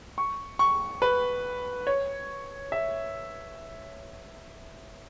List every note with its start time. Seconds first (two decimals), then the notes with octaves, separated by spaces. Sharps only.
0.18 C#6
0.59 C#6
1.02 B4
1.87 C#5
2.72 E5